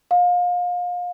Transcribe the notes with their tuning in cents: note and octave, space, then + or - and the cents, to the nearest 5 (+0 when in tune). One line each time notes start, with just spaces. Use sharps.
F5 +30